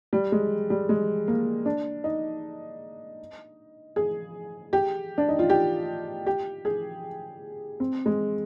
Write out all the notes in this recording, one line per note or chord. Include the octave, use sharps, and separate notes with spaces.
G3
G#3
G3
G#3
A#3
D4
D#4
G#4
G4
D4
D#4
F4
G4
G4
G#4
C4
G#3